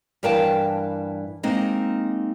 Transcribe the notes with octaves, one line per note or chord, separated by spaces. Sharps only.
G2 E3 A#4 F5 G5 A5
G#3 A#3 C4 D#4